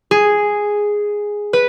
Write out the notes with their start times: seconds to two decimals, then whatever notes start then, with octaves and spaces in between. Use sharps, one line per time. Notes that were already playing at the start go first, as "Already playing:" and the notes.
0.11 G#4
1.53 B4